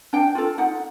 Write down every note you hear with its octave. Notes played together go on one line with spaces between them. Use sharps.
D4 G5
F4 A4
D#4 F#5